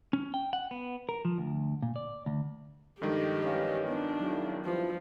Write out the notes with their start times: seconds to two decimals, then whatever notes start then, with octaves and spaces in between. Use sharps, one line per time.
0.13 C#4
0.34 G5
0.53 F#5
0.71 B3
1.09 A#4
1.25 F3
1.38 D2
1.82 A#2
1.96 D5
2.26 D2
3.02 G2 D#3 F3 G#3 G4 A4 D#5
3.43 E3 G3 C#4 D#5 F5
3.89 B3 D4 F4
4.20 F#2 C#3 F#3 D#4 E4 F#4
4.65 G2 F3 C#4 E4